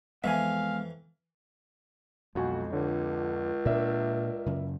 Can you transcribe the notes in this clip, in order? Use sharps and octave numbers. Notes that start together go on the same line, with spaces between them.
F2 E3 G#3 B3 E5 F5 G#5
B1 F2 G#3 F#4 G#5
C#2 D3 C#5
A#2 D4 A#4 D5 E5
F#2 C#3